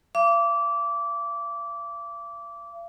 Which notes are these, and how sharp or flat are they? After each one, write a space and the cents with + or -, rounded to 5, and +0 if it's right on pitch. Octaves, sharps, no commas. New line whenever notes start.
F5 -45 D6 -20